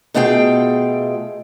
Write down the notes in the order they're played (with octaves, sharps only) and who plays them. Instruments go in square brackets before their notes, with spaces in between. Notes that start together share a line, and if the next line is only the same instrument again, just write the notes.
[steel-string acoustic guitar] B2 A3 F4 G#4 G5